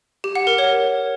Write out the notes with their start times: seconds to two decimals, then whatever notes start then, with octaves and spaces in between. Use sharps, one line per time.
0.24 G4
0.35 F#5
0.47 A#4
0.58 C#5